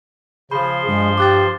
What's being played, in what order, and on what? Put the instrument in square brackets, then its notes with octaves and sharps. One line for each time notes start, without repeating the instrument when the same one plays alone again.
[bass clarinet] C#3 [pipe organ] F3 C5 C6 [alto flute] G#4 [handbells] B5
[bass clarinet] G2 [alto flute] G#3
[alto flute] G4 [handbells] D6 F#6 A6